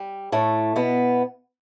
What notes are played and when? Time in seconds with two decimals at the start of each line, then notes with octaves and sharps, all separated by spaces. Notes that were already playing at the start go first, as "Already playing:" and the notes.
Already playing: G3
0.32 A2 A3
0.76 B2 B3